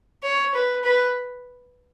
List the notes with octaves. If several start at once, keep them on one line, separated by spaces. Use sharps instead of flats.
C#5
B4
B4